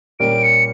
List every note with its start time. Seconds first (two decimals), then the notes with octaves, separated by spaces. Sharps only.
0.20 A#2 G3 C#4 G4 A#4 D7
0.43 C#7